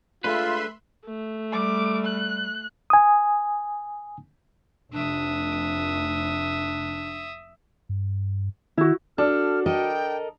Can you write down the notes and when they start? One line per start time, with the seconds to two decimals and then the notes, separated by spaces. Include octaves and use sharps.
0.24 G#3 A3 D4 F4 B4 E5 B5 C6
1.05 A3
1.52 G3 D6
2.05 F#6
2.90 G#5 D#6
4.94 F1 D4 E5 D#6
7.89 G2
8.77 D#3 E4 F#4
9.18 D4 F#4 A4 F6
9.66 A4 A#4 D#5 G5